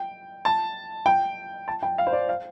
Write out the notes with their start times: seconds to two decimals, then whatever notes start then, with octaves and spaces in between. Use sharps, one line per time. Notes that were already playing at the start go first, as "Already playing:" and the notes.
Already playing: G5
0.45 A5
1.06 G5
1.68 A5
1.83 G5
1.98 F5
2.07 C5
2.13 D5
2.29 F5